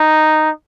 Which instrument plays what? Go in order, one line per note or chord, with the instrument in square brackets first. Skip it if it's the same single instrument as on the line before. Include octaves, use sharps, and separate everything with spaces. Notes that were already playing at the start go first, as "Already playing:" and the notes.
Already playing: [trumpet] D#4